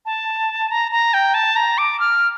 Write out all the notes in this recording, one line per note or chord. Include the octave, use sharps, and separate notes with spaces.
A5
A#5
A#5
G5
A5
A#5
D6
F6